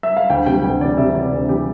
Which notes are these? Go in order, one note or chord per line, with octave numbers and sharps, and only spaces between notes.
E5
F5
D2 G5
C3 G5
D2 G5
E3 D5
C3 E5
E3 D5
D2
E3 G4